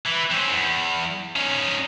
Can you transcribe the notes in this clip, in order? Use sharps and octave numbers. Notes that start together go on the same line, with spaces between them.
E3
C4 C#4
E2
C#4 D#4